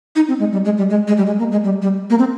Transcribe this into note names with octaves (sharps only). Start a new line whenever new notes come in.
D#4
C4
G#3
G3
G#3
G3
G#3
G#3
G3
G#3
A#3
G#3
G3
G3
A#3
C4